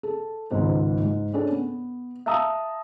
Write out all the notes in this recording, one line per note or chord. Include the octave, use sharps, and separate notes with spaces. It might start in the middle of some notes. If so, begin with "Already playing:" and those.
A4
G#1 C#2 G#2 C5
G#2
C#4 D4 A4 C#5
B3
E5 F5 A5 A#5 D#6 E6